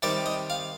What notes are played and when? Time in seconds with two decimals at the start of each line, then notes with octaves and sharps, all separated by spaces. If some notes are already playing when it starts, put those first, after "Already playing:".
0.03 C3 D#3 G3 D5
0.26 D#5
0.50 F5